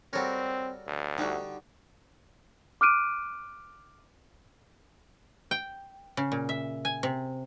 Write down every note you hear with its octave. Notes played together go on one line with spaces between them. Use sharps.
G3 C4 F#4 A4 A#4 C#5
D2
D3 G3 D#4 F#4
D6 F6 F#6 D7 D#7
G5
C#3
A#2
E5
G#5
C3